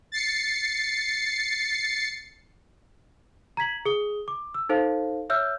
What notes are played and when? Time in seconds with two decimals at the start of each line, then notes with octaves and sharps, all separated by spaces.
0.12 A6 C7 C#7
3.57 A#5 G#6 B6 F#7
3.85 G#4 D#6 G7
4.28 D6
4.54 E6
4.69 D#4 A4 C5 F5
5.30 C#5 E5 E6 F6 G6